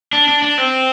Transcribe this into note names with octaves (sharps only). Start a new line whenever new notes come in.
D4
D4
D4
C4